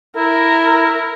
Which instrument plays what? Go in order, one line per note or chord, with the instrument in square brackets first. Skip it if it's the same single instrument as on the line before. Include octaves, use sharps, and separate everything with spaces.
[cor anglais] E4 [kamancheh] A#4